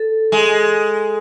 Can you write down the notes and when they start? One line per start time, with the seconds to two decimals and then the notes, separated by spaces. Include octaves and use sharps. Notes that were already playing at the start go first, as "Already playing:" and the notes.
Already playing: A4
0.32 G#3